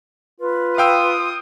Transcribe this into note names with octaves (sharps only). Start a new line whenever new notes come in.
F4 B4
F5 G5 D#6 E6